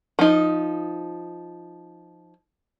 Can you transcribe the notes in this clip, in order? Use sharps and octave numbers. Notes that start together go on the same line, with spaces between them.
F3 D#4